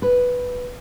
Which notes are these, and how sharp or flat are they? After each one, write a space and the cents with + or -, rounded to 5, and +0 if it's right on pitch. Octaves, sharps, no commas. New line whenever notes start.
B4 +0